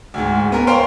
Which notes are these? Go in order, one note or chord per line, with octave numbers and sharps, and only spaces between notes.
D2 G#2
B3 A#4
C5 C#5 F5 G5 C6